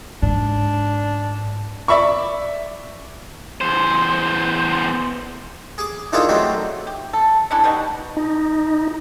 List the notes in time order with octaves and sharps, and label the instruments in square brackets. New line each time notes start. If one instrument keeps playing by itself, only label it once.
[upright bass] G#2 [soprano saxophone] D4
[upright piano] D5 E5 B5 C#6
[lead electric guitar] E2 C5
[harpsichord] G#4 D6
D#3 D4 E4 F4 G#4 A4
F#3 G#3 A3 C4
[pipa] G4
A4
C#4 D4 E4 A4
B2 G3 D#4 F#4
[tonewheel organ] D#4